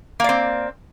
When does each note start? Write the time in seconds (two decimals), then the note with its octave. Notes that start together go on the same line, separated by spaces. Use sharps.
0.20 A#3
0.24 D5
0.29 C4